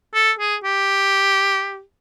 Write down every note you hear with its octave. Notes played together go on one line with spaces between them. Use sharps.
A4
G#4
G4